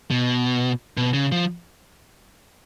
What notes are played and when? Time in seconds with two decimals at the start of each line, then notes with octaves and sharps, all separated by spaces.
0.11 B2
0.97 B2
1.14 C#3
1.32 F3